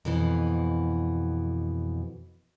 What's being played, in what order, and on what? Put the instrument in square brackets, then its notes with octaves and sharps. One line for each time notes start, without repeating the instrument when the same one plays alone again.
[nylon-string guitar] F2 B2 E3